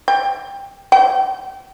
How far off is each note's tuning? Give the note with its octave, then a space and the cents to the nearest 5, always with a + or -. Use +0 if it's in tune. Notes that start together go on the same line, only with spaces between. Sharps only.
G5 +5
G5 -25